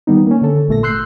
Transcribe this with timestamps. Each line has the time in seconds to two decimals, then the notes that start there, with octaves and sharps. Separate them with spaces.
0.07 D#3 G3 B3 D#4
0.27 A#3 C#4
0.42 D3 A4
0.68 G#1 A#2 A3 A4 A#6
0.83 C6 E6 F#6 G6 C7